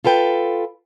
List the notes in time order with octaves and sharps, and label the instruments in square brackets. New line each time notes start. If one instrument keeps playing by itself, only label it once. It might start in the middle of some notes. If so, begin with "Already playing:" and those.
[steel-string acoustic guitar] F4 A4 B4 G5